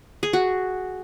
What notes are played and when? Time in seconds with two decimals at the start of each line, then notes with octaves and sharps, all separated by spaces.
0.23 G#4
0.33 F#4